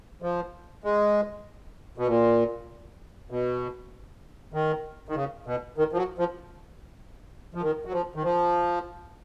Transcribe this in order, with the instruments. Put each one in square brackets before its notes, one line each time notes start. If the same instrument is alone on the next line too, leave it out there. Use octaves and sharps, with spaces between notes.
[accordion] F3
G#3
B2
A#2
B2
D#3
D#3
C#3
B2
D#3
F3
F#3
F3
F3
D#3
F#3
F3
D#3
F3